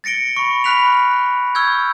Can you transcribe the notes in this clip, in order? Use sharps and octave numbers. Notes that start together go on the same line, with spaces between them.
A6 A#6 C#7 D7 G7
B5 C#6
B5 F6 F#6 B6 F7
C#6 E6 F6 G6 G#6